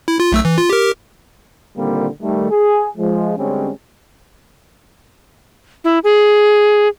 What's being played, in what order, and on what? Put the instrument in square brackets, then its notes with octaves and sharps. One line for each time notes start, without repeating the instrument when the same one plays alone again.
[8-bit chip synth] E4
F4
B1 A3 E6
E3
F4
G4 A#4
[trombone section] A#2 D3 D#3 G3 A#3 C4
D#3 G3 A3
G#4
F3 G#3
D3 G3 G#3 C4 C#4
[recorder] E4
G#4